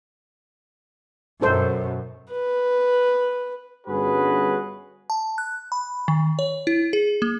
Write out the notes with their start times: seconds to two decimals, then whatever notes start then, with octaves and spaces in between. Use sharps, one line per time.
1.41 F#2 B2 D#4 A4 C5
2.32 B4
3.87 G1 G2 C#4 F#4 G#4 B4
5.10 A5
5.38 F#6
5.72 B5
6.08 D#3
6.39 C#5
6.67 E4
6.93 G#4
7.22 A#3